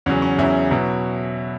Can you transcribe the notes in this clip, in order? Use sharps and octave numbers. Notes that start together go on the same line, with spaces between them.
E2 C#3 F#3 C#4
C#4
E2 C#3 F#3 E4
B2 F#3